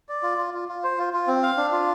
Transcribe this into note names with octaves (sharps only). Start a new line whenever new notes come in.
D5
F4
F4
F4
F4
C5
F4
F4
C4
F5
D4
F4